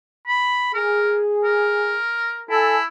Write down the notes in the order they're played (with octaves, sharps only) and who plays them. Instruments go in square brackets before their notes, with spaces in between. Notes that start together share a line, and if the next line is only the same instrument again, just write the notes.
[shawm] B5
[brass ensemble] G#4 [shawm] A#4
[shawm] A#4
[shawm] E4 [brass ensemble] A4 G#5